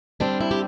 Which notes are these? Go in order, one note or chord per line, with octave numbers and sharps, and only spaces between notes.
D3 G3 C4 D4
E4
G4